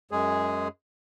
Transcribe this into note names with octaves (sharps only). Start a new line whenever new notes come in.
F#2 G#3 G#4